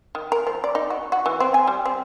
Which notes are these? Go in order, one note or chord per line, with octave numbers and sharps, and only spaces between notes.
D#3
A#4
F3
D5
D#4
F#4
F#4
E3
C4
G#5
G3
C4